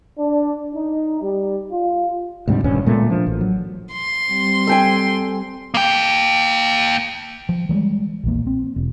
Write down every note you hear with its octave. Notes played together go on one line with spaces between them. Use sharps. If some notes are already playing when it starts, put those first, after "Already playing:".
D4
D#4
G3
F4
D2 G#2 C3 G3
D#1 D2 G2 C#4
A#2 G#3 A3 B3
F3 D4
A1
F#3
C6
G3 C4
A4 G5 G#5
A#3 G5
F3
E3 G3 G#3
A#1 E2 A#3
C4
E1